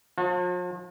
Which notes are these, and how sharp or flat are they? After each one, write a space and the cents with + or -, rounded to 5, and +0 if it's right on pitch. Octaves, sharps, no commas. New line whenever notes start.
F3 +45 F#4 -40